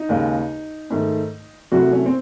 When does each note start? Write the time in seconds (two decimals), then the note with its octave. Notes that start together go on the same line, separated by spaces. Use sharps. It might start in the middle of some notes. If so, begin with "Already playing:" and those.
Already playing: D#4
0.09 D#2 C#3 G#3
0.90 G#2 D#3 A3
1.72 C2 C3 F#3 A3 F#4
1.92 C#4
2.06 C4